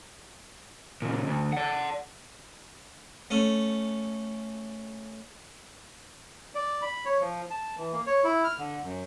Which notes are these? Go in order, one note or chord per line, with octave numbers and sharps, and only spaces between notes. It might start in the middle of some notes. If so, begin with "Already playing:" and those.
A#2 C#3
D2
D5 F#5
A3 C#4
D5
B5
C#5
F3
A5
E3
A#3
C#5
E4
F6
D3
F#2